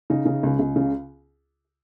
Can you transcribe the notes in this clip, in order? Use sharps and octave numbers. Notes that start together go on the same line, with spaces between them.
C#3 D#4
C#3
C#2
C#2
C#3